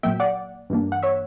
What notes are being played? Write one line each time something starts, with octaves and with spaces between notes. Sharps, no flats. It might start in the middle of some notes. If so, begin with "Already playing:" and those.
A#2 F#3 A#3 E5 G5
D5 F#5
G2 E3 A#3 D4
F#5
C#5 E5